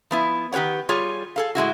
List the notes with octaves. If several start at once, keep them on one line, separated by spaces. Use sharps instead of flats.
F3 B3 E4
D#3 G4 B4 C#5 F#5
G3 F4 G#4 C#5
G#4 A4 F5
A2 G#3 E4 F#4